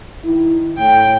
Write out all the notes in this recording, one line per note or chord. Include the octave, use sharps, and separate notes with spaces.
D#3 E4
A2 G5